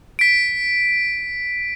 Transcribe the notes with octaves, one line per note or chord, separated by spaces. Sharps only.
B6 D7